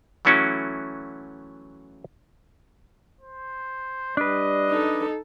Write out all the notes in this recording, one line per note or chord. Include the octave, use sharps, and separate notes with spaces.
E3 F#3 A3 C#4 E4 F#4
C5
G3 D4 B4 D5 D#5
D#4 A4